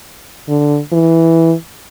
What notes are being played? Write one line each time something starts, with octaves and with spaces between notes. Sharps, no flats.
D3
E3